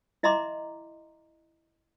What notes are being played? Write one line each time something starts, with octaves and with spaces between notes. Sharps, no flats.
E4 D#5 E5 A#5 C6 D6